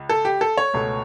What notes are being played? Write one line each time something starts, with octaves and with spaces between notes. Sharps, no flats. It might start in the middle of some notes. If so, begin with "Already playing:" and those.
Already playing: C#2
A4
G4
A4
C#5
C#2 B2 A3